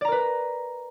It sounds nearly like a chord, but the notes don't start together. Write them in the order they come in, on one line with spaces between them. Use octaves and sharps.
D5 A#5 A#4 B4